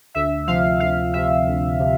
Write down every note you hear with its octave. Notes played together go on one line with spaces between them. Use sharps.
D2 E5
C3 F3 F5
D2 F5
C3 F3 E5
D2
C3 F3